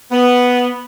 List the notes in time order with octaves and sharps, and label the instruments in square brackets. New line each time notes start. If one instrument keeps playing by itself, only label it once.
[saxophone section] B3